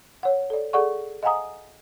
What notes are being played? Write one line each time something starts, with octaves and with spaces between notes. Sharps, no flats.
C#5 F#5
A4 D5
G#4 A4 D5 F#5 C#6
D#5 F5 F#5 G#5 A#5 D#6